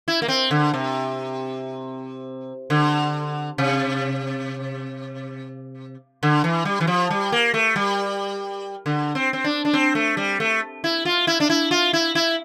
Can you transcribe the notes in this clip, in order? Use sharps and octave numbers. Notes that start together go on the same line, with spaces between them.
E4
A#3
C4
D3
C3
D3
C3
D3
E3
G3
E3
F3
G3
A#3
A3
G3
D3
C4
C4
D4
D4
C4
A3
G3
A3
E4
F4
E4
D4
E4
F4
E4
E4